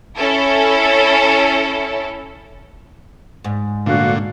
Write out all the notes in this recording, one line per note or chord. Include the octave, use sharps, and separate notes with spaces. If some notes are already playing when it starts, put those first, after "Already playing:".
C#4 E4 A4
G#2
D2 A#2 D3 F#4 F5